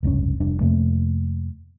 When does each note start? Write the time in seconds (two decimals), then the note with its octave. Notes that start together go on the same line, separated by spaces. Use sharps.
0.03 F1 C#2 G2 C#4
0.40 F1 G3 D4
0.61 F2 C3 A3 A#3